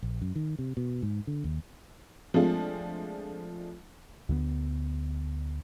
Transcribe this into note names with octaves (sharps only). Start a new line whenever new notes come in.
A#1
F#2
D#3
C3
B2
G#2
D3
D#2
F3 G#3 A3 C4 D4 F4
D2 D3 E3 B3